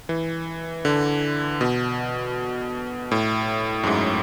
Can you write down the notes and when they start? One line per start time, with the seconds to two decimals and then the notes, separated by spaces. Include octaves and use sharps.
0.09 E3
0.85 D3
1.61 B2
3.11 A2
3.83 F#2
3.87 G#2